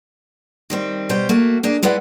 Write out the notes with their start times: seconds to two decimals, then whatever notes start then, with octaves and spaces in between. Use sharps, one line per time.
0.70 D#3 G3 C4
1.09 B2 G3 C5 G5
1.29 A3 A#3 F#4
1.63 A#3 D4 G#4
1.83 G#3 E4 B4 D5 F#5